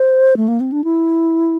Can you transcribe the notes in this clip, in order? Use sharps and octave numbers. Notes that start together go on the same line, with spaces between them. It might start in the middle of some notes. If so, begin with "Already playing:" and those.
Already playing: C5
A3
A#3
C4
D4
E4